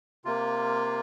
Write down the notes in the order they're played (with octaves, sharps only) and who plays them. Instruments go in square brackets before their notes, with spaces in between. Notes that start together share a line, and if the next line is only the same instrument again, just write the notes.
[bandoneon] C3 A#3 F4